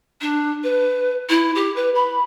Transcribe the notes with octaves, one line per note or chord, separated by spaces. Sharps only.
D4
B4
E4
G4
B4
B5